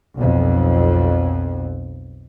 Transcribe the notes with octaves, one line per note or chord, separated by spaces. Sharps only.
B1 F2